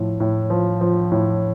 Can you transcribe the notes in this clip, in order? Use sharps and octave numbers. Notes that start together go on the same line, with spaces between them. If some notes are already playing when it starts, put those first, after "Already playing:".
Already playing: A2 F3
A2
F3
F3
A2